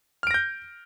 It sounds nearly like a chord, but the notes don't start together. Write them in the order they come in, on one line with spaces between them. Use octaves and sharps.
F6 D7 A#6 G6